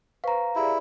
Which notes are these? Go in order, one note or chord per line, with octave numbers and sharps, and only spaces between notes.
B4 C5 F5 A#5 C#6
E4 G4 G#4 D5